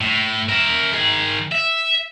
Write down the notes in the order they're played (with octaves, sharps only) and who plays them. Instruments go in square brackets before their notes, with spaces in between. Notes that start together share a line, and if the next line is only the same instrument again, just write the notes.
[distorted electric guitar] A2
A#4 E5
D#3 G#4
E5